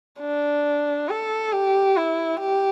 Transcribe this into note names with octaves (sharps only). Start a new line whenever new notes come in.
D4
A4
G4
E4
G4